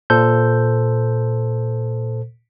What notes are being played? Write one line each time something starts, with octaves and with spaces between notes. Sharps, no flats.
A#2 A4 C5 G6